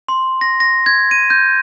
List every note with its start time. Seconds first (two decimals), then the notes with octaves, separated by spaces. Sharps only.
0.09 C6
0.41 A#6
0.60 A#6
0.86 G#6
1.11 D#7
1.30 G6